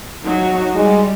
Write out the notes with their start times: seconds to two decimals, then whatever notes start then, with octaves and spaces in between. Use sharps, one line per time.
0.25 F#3 D#4 F#4
0.75 G3 G#3